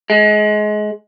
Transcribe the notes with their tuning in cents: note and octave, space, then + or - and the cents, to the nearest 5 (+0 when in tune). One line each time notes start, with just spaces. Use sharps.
G#3 +25